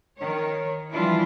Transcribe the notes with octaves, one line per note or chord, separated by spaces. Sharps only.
D#3 C#5
E3 F3 G3 D4 E4 F4